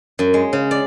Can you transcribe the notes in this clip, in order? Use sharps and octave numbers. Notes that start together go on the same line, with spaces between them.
F#2
G#3
C#3
D5